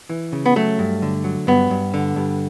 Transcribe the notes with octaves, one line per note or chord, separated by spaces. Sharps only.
E3
C#3
B3
F#3 A3
G2
D3
F#3
G2 B3
G2
D3
G2